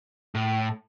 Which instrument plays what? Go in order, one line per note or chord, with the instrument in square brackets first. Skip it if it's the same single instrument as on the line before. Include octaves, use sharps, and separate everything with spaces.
[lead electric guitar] A2